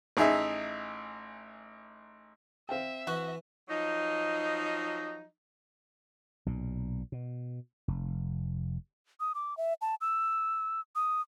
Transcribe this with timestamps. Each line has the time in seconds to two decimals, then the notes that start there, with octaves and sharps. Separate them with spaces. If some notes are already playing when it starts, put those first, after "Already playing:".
0.17 A1 D#4 G#4 E5
2.69 C4 E5 F5 G5
3.07 E3 F#4
3.68 F3 F#3 D#4
6.46 B1 A#2
7.12 B2
7.88 F1
9.20 D#6
9.35 D6
9.57 E5
9.82 A5
10.01 E6
10.96 D#6